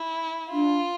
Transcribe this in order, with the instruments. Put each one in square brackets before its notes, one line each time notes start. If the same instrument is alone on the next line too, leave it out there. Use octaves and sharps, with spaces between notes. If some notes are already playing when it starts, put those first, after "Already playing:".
Already playing: [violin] E4
[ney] D4 [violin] F4